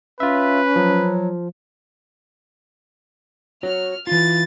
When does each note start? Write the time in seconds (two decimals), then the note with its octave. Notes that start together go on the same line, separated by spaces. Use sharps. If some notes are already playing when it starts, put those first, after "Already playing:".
0.20 C#4 F4 B4 E5
0.76 F3 F#3
3.63 F#4 C#5 F6
4.07 E3 F4 A6